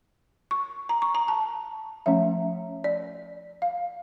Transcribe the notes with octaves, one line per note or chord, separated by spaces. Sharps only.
C#6
A#5
C#6
A#5
A5
F3 A3 C#4 E5
D5
F5